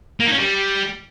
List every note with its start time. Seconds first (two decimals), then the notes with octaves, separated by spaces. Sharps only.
0.20 A#3
0.26 D#4
0.32 C#4
0.38 G3